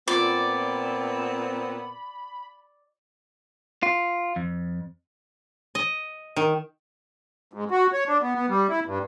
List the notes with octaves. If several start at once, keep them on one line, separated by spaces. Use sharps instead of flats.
A#2 B3 C4 F4 D5 B5 C6
F4
F2
D#5
D#3
G#2
F#4
C#5
D4
B3
B3
G3
E4
G2